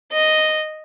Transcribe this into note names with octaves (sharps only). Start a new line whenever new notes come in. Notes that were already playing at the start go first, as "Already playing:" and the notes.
D#5